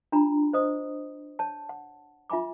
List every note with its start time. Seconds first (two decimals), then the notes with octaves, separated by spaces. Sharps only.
0.12 D4 F4 A#5 B5
0.53 C5 D#5 D#6
1.39 C#5 A5
1.69 F#5
2.30 F4 E5 G#5 B5 D6